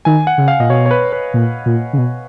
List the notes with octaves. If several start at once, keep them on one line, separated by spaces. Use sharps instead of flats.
D#3 G#5
F#5
C#3
F5
A#2 D#5
B2 C#5
C#5
B4
B4
A#2
A#2
C#3
B2